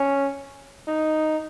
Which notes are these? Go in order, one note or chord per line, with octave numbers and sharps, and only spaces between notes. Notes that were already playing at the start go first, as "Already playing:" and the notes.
Already playing: C#4
D#4